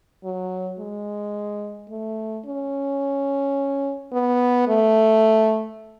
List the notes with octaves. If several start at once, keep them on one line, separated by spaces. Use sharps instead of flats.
F#3
G#3
A3
C#4
B3
A3